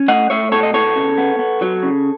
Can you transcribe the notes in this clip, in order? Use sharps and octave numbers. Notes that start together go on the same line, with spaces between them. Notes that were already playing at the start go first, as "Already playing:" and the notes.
Already playing: C#4
A3 D#5 F#5
A3 C#5 E5
B2 A4 C#5
D#5
B3 A4 C#5
C#3
B3
B3
F#3
C#3